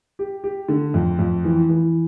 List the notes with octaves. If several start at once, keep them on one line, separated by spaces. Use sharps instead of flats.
G4
G4
D3
F2
F2
E3
E3